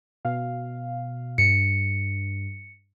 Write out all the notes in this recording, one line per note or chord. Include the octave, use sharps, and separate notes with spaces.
B2 F5
G2 C#7